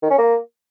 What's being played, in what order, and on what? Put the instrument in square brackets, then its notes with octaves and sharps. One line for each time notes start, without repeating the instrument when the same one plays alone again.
[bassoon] D#3
C#4
A#3